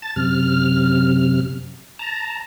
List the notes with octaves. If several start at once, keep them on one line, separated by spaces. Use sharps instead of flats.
A5 A6
F#2 C3 F6
A5 A#5